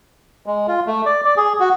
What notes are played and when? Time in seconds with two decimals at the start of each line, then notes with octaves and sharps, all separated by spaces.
0.46 G#3
0.68 F4
0.87 A3
1.06 D5
1.25 D5
1.37 G#4
1.60 F#4